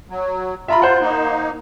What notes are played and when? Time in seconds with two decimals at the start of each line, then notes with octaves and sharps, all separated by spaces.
0.10 F#3
0.68 F4 E5 A#5 B5
0.82 C5 F#5
1.01 A#3 D#4